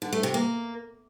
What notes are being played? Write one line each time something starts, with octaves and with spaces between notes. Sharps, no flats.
D3
A3
C3
A#3